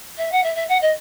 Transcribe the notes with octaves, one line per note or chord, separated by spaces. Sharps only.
E5
F#5
E5
E5
F#5
D#5